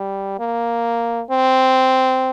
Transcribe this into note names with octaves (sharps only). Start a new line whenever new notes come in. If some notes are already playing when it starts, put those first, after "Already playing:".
Already playing: G3
A#3
C4